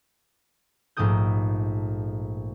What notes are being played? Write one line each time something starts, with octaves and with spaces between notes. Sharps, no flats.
A#1 G#2 A3 G4 D#6 G6